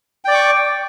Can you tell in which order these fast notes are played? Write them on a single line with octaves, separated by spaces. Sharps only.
G5 D5 D6 C#6